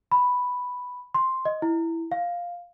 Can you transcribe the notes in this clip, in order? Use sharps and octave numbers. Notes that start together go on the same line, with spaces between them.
B5
C6
D#5
E4
F5